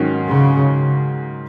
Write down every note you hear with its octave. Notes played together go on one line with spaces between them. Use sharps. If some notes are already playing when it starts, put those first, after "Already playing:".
Already playing: G#2 D#3 F#3 C#4 F#4
C#3